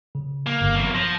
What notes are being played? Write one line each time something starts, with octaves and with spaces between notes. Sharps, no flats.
C#3
A#3
G1
E2 F#3
F3 A#6